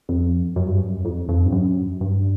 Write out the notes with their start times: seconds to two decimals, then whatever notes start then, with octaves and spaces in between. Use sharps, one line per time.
0.09 F2
0.56 F#2
0.67 G2
0.77 F#2
1.05 F2
1.28 F2
1.46 G2
1.52 F#2
2.01 G2